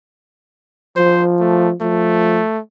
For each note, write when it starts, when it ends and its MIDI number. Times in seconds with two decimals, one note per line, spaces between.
0.96 1.74 53
0.96 1.24 72
1.40 1.70 57
1.81 2.41 53
1.81 2.60 57